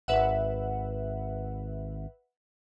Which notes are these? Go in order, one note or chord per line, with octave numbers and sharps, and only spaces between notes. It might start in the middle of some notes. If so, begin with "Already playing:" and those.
G#1 B4 E5 F#5